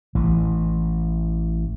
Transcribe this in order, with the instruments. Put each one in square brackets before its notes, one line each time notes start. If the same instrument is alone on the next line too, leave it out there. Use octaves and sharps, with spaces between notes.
[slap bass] A1 E3